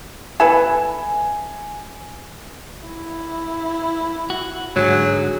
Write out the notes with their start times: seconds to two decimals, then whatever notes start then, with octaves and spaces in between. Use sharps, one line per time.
0.40 E4 A4 B4 G#5
2.87 E4
4.30 F#4
4.76 G#2 D3 F#3 G#4